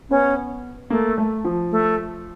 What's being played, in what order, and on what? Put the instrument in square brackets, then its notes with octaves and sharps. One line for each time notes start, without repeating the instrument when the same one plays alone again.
[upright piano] B3 [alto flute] C#4
[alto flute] A3 [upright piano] A#3
[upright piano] A3
F3
[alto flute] A3